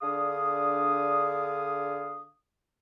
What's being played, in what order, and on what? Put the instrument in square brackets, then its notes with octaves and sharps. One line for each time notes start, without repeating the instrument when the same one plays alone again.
[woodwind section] D3 D4 G#4 F5 D#6